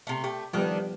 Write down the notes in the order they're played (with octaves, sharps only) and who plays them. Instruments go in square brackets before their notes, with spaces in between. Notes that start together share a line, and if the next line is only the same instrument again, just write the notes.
[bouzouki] C3 A3
[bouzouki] A3 [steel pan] G4
[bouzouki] D#3 A3 D4 [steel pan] F3 G3 B3